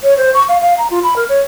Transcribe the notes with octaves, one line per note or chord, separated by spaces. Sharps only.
C#5
C5
C#6
F5
F5
A#5
F4
B5
A#4
C#5